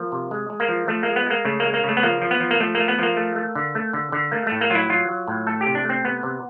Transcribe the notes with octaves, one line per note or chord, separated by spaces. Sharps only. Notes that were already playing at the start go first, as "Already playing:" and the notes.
Already playing: F3 A#3
C3
G#3
G#3
A#3
F3
F3 A3
G#3 A#3
B3
G#3 A#3
C#3 A3
G#3 A#3
A#3
C#3 A3
B3
F3 A#3
F3
B3
F3
A#3
F3 A3
A#3
A3
B3
F3 A#3
A3
A3
D3
A3
D3
D3
A3 A#3
A2 A3
A#3
F#3 F4
E4
F#3 F4
F#3
A2
A3 A4
G4
C3
D4
A3 C4
C3 B3
C3